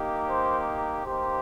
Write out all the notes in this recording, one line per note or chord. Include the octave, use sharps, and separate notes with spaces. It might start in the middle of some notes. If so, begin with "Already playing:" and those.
Already playing: A#3 D#4 G4
C5
A#3 D#4 G4 C5